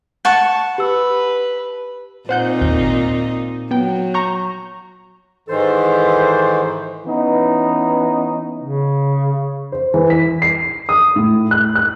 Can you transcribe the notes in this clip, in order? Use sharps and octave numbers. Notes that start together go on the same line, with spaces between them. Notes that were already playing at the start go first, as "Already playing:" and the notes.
F#5 A5 C#6
G4 B4 E6
A#2 C4 D#4 C5 F#5 G6
G#1 D#2 G6
F#3 B3 G5
A#5 C#6 G6
G#2 D#3 E3 A4 C5
E3 B3 C#4 D#4
C#3
C5
E3
B6
C7
D#6
A2
F#6
F#6